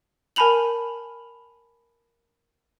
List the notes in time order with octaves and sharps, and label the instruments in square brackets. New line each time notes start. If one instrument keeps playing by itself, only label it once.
[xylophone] A#4 G#5 A5 B5 F7 F#7